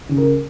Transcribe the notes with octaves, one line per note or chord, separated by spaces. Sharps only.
C#3
A#4